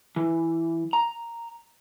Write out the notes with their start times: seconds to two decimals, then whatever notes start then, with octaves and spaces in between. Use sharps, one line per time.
0.16 E3
0.93 A#5